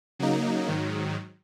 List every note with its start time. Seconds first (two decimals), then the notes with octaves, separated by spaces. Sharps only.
0.19 C#3 F#3 A#3 D#4
0.68 G#2 D#3 F#3